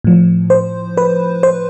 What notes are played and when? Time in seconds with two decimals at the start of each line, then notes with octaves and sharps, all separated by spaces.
0.04 A2 F3
0.50 C5
0.97 B4
1.43 C5